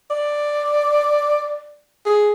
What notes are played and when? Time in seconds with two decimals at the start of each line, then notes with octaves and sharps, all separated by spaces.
0.11 D5
2.06 G#4